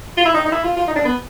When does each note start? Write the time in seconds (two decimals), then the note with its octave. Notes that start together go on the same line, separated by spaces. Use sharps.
0.17 F4
0.25 E4
0.35 D#4
0.46 D#4
0.52 E4
0.64 F4
0.76 F4
0.88 D#4
0.96 D4
1.05 B3